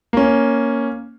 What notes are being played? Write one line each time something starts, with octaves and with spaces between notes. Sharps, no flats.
A#3 C#4